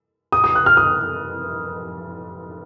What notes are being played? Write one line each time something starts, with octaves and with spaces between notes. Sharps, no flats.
D#6
D#6
F#6
F6
D#6